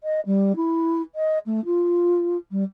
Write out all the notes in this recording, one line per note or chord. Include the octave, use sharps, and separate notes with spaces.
D#5
G3
E4
D#5
A3
F4
G3